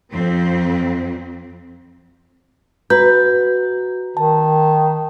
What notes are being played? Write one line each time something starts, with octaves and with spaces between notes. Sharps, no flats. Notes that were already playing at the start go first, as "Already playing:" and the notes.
F2 C4
F#4 B4 A#5 G6
D#3 A5